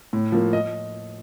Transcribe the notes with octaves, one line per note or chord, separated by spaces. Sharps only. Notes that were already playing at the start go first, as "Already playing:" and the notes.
A2
F3 A#3
D#5